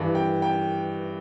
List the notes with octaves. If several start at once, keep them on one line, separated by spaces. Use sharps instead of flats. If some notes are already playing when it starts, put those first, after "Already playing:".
Already playing: G2 E3
G5
G5